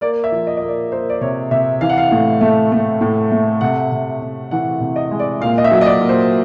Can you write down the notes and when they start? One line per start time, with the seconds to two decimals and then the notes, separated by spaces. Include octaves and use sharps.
0.01 A#3 D5
0.24 E5
0.32 F3
0.47 D#5
0.57 A#3 D#5
0.68 D5
0.92 A#3 C5
1.09 D5
1.21 C3 C#5
1.51 C3 E5
1.81 E3 F5
1.89 F#5
1.98 F5
2.11 A2
2.41 A3
2.72 A3
3.01 A2
3.31 A3
3.61 C3 F#5
3.91 C3
4.22 C3
4.51 E3 F#5
4.81 C3
4.96 D#5
5.11 G#3
5.19 D5
5.41 A#2 F5
5.58 D#5
5.64 E5
5.71 F#3
5.81 D#5
5.86 D5
6.01 A#2
6.09 C5